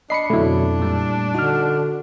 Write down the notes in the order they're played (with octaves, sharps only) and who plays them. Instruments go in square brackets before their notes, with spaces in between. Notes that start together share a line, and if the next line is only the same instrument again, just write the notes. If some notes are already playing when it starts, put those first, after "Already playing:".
[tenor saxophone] D4 [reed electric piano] D#5 B5 [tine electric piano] C7 C#7
[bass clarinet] F2 [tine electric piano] B2 D3 F#3 [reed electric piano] A3 E4
[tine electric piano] A#2 G3
[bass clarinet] D3 [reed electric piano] D#4 F6 [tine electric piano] F#4